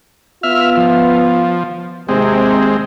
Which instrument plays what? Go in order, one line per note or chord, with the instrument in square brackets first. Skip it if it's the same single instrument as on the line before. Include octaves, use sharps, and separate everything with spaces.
[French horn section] B3 F4 [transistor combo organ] E5 F6
[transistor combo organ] F3
[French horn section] D#2 C3 [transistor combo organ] G#3 C4